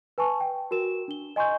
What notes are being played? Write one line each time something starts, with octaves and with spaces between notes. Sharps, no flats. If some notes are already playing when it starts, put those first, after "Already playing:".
B4 G#5 A5 C#6
G5
F#4 A#4 E7
D4 G7
D#5 G#5 C6 C#6 G6